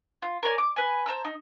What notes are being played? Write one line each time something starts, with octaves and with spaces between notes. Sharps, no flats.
F4
A#4 C#5 D5 G#5
D6
B4 G#5
C5 A5 A#5 E6
D#4